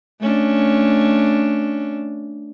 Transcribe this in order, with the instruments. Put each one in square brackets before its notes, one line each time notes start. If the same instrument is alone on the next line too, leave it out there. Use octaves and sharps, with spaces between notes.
[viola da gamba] A3 C#4 D4